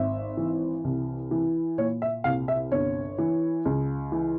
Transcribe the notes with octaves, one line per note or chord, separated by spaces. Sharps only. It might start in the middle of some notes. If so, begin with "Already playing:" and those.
Already playing: G#1 E5
E3
C2
E3
A#2 C#5
E5
C2 F5
E5
G1 C#5
E3
C#2
E3